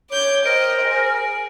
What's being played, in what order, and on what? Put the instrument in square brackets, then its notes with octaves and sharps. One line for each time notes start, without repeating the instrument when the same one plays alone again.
[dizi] C#5 [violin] D6 G6
[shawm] A#4 [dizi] C5 [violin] D#5 G5 [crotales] D7
[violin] G#4